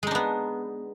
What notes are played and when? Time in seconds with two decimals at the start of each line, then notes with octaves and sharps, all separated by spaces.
0.03 G#3
0.07 D#4
0.11 D4
0.15 B3